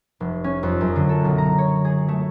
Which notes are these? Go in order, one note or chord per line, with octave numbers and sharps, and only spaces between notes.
F1
C#4
F2
F#2
D3
A4
B1
A#5
C#5
G#4
A3